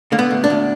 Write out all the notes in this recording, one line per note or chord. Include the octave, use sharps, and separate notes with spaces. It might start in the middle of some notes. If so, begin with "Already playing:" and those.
D3 A#3
B3
D2
D4
D2